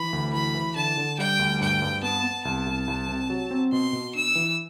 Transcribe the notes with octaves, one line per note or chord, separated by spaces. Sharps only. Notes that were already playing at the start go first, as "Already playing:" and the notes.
Already playing: E3 B5
D2
E3 B5
E3
D3 A5
D3
G3 G5
D2
G2 G5
G2
B3 A5
B3
C2 A5
C2
C2
C3
F#3
C4
B2 C6
B2
D4 E6
E3